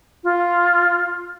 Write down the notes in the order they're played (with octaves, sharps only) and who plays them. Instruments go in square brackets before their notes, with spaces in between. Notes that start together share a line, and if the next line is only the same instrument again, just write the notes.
[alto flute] F4